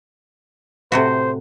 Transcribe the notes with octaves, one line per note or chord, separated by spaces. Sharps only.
A2 C3 F#4 C5